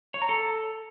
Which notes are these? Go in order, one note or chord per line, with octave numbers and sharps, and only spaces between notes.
C#5
A#5
A4